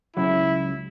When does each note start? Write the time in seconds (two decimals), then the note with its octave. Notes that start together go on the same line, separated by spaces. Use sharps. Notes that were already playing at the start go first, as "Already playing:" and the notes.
0.16 C#2 C#3 F#3 E4